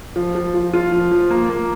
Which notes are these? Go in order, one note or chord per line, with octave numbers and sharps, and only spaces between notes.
F3
F3
F3
F4
F3
F3
A#3
A#3